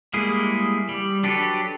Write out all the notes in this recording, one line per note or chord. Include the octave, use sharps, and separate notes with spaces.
G3 G#3 A#3 E4 G#4
G3
F#3 D4 G4 A4 B4